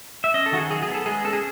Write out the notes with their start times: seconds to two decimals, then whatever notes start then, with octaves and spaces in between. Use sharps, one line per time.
0.24 E5
0.34 C#4 D#5
0.46 A4
0.52 D#3 F#4
0.58 G#4
0.70 F#3 G#4
0.83 G#4
0.88 B3
0.94 A4
1.06 G#3 G#4
1.24 C#4 A4
1.33 G#4